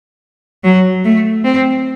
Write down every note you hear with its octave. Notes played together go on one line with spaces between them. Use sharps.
F#3
A3
C4